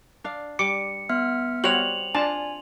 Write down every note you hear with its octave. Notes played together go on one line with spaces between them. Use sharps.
D4 F5
G3 D6 C#7
B3 E5 F6
G3 C4 F#4 C#5 F#5 F7 F#7
D4 F4 G#5 A5